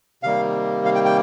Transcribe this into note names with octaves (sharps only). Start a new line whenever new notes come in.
C3 D#3 G3 A#3 F5
F5
G5
G5